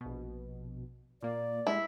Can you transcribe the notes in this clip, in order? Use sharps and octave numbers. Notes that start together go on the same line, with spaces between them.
A#1 B2
A#2 A#3 D5
G3 G#3 E4